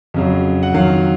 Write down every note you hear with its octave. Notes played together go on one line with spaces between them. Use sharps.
F2 C#3 F#3
F#5
F2 D#3 F#3 F5